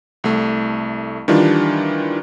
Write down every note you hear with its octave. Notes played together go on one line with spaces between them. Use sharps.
C2 A3
D#3 E3 G3 D4 F4